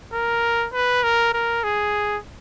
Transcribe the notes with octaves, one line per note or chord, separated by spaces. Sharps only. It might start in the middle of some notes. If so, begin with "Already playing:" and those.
A#4
B4
A#4
A#4
G#4